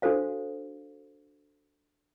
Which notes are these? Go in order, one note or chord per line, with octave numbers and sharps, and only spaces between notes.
D4 F#4 A4 C5 F5